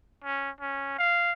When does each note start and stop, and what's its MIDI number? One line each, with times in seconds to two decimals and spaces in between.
0.24 0.50 61
0.60 0.98 61
0.98 1.32 77